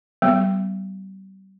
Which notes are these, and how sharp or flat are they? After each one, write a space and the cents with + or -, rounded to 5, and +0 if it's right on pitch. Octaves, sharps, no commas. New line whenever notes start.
G3 -35 B3 +20